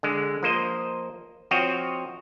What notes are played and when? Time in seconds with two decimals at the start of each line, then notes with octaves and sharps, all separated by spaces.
0.03 D3 G#3
0.43 F3 A#3 C5 D#5
1.51 F3 C4 F#4 C#5 D#5